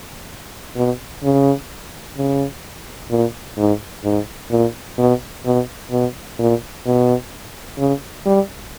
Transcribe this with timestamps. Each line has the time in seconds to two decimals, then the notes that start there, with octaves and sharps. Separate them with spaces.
0.76 B2
1.23 C#3
2.17 C#3
3.10 A#2
3.57 G#2
4.04 G#2
4.51 A#2
4.99 B2
5.45 B2
5.91 B2
6.39 A#2
6.86 B2
7.78 C#3
8.26 G3